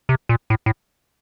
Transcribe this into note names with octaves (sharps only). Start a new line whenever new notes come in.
C3
A#2
A2
A2